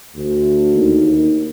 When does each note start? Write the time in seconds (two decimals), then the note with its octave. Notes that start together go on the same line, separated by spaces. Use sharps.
0.16 D2
0.75 D#2